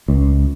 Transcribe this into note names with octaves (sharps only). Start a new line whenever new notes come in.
C#2